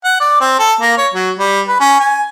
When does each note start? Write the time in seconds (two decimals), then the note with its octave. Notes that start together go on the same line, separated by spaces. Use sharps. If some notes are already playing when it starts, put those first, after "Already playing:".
0.04 F#5
0.20 D5
0.41 C4
0.59 A4
0.81 A#3
0.97 C#5
1.14 F#3
1.39 G3
1.67 B4
1.80 C#4
1.99 G#5